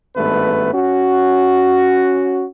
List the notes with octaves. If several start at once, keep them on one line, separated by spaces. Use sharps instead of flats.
G#1 G2 A3 B3 B4
C#4 F#4